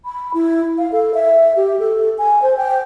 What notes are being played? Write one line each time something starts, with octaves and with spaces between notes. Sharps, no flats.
B5
E4
F5
A4
E5
G4
A4
G#5
C5
G5